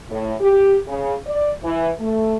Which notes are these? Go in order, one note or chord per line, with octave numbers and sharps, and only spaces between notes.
A2
G4
C#3
D5
E3
A3